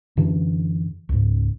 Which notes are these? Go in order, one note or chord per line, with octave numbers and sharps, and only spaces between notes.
F#2 D3 E3
C#2 G#2